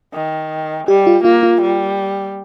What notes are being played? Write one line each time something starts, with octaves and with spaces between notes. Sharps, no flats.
D#3
G3 G4
F4
A#3 F4
F4
G3